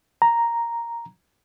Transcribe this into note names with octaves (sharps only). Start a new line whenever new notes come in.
A#5